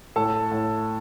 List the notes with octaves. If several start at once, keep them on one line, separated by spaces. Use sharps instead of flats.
A2 A4 A5
A2